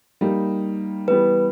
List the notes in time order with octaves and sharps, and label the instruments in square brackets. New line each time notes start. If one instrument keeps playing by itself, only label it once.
[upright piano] G3 A#3 D#4
[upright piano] E3 G3 B3 [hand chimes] B4